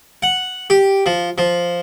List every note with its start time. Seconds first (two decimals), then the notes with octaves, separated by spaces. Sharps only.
0.23 F#5
0.70 G4
1.06 F3
1.38 F3